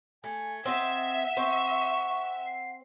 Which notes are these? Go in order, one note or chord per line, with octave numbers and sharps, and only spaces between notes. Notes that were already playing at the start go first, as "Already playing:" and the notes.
A3 G#5 G#6
C4 D#5 E5 F#5
C4 C#6
C7